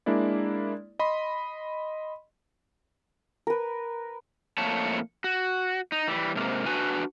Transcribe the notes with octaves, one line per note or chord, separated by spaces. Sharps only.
G#3 A#3 D4 E4 D5
D#5 B5 C6
A#4 B4
F2 A2 A3 A#3 C#5 A5
F#4
D#4
E3 G3
G#2 C3 A#3
D4 F#4 B4 G#5